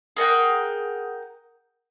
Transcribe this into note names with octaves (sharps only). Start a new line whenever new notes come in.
G#4 A#4 F#5 G5